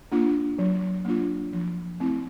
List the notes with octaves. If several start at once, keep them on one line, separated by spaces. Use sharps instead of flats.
A#3 D4 F4
F#3
A#3 D4 F4
F3
A3 C4 E4